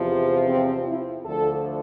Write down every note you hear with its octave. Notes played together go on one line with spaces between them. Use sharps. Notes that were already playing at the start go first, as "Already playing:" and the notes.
Already playing: E2 C3 F3
C4
E4
D2 D3 F3 A4